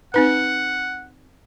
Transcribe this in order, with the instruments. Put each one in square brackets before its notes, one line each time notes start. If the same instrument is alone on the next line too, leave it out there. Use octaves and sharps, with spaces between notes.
[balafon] C4 D#4 B4 [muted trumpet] F#5